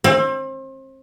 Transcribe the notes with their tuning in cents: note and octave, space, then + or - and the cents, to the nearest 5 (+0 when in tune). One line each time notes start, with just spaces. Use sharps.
C4 +35